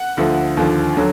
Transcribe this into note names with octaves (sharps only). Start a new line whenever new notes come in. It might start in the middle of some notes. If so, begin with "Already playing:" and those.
Already playing: F#5
D2 D3 F3
D#2 D3 F3
D3 F#3